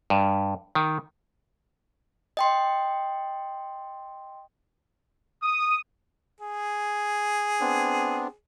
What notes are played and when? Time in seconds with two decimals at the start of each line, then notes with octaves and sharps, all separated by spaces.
0.10 G2
0.75 D#3
2.37 D#5 G5 C6
5.42 D#6
6.40 G#4
7.60 B3 C4 D4